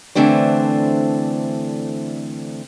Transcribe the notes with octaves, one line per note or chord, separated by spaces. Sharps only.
D3 E3 A3 C4 D4 C5